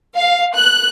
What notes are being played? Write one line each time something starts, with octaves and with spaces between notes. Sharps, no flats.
F5
F#6